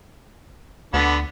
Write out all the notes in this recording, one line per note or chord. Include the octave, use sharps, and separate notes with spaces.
D2 D3 B3